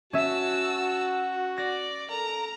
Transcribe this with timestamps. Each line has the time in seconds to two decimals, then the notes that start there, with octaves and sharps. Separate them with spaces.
0.13 C#4 F#4 E5 A5 E6
1.58 D5 A#6
2.10 A4 A#4 A#5